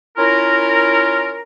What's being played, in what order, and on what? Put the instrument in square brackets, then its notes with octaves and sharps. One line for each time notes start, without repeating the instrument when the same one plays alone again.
[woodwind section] C#4 E4 F4 A#4